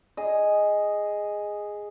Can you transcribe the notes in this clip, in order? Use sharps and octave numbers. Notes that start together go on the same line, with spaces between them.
G#4 D#5